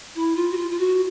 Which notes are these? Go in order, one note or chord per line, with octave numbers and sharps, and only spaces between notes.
E4
F4
F#4
F4
F4
F#4